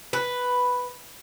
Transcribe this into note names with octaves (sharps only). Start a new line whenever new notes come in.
B4